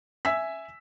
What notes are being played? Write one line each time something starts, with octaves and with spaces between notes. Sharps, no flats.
E5 G#5 E6 B6